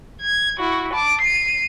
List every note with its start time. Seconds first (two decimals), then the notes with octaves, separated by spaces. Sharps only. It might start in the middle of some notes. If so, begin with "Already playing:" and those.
0.21 G#6
0.59 E4 F#4
0.93 A5 D6
1.21 C7 D#7